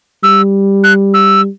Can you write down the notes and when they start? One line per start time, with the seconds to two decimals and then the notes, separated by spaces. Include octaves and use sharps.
0.23 G3 E6
0.84 F#6
1.14 E6